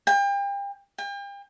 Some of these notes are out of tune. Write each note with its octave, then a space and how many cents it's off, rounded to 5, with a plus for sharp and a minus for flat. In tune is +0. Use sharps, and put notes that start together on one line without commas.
G5 +35
G5 +40